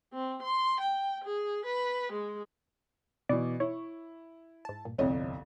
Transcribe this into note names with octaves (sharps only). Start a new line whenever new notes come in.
C4
C6
G5
G#4
B4
G#3
B2 E3 D5
E4 C#5
G#2 A5
G2 A#2
G1 C2 F2 A3 C#5 D#5